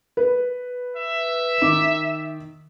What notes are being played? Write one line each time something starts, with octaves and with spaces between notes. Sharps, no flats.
B4
E5
D#3 D6